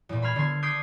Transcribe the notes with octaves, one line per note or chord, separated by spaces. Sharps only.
E2 A#2
B5 C6 F6 G#6
D3 B3 C6 G#6
D6 D#6 G6 G#6 B6 C7